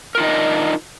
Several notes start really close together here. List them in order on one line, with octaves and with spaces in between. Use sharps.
A#4 F4 D#4 D#5 D4